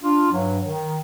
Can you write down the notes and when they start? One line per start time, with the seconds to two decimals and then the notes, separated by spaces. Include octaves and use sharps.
0.02 D4 F4
0.32 G2 F#3
0.65 D#3